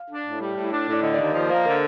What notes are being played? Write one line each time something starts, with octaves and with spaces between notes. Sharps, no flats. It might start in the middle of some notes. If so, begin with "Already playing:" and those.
Already playing: F5
D4
A2
G3
A2
D4
A2
D5
D3 D#5
D5
D#2 D#5
F3 D#5
A#3 C5
D3 A#4